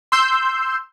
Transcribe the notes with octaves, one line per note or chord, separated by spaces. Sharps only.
C6 E6 G6